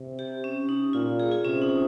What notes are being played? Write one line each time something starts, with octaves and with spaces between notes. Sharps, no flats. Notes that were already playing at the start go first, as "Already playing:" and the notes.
Already playing: C3
G4
C#4
D#4
A#2 F4
G#4
F4
C3 C#4
D#4